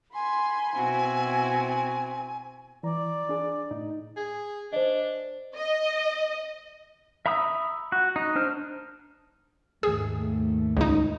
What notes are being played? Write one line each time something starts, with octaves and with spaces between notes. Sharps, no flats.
G#5 B5 C6
B2 C4 E4 F#4
E3 D5 A#5
D4 G#4
A2 D#4
G#4
D4 C5 D#5
D#5
E5 A#5 B5 D#6 E6
F#4
D#4
D4 C5 F6
D#2 G#2 A3 G#4
C#2 D#4